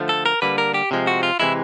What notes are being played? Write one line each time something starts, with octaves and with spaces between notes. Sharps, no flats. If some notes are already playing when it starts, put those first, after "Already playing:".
Already playing: D3 F3 A3
A4
A#4
D3 G3 A#3 B4
A#4
G4
C3 F3 G#3
F#4
F4
C3 E3 G#3 E4